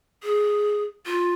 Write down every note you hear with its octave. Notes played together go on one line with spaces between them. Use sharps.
G#4
F4